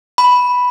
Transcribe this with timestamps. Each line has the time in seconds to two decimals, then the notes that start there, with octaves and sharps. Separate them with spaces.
0.18 B5